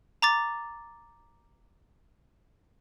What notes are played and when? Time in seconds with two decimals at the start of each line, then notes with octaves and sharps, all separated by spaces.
0.22 A#5 D6 A6